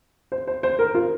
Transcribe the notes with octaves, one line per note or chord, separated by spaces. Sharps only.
C5
C5
C5
A#4
F4